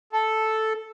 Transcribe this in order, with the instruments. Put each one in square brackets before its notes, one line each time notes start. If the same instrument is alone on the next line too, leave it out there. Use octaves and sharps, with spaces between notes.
[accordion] A4